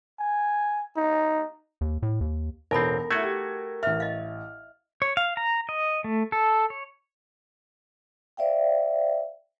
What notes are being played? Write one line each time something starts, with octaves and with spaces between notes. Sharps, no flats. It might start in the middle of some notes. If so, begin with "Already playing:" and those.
G#5
D#4
D#2
A2
D#2
E1 A1 C4 D#4 A4 A#4 B5
A3 E4 F#4 G#6
G4
A1 E5 F6
D#5 F5
C#5
F5
A#5
D#5
A3
A4
C#5
C5 D5 E5 F5 G5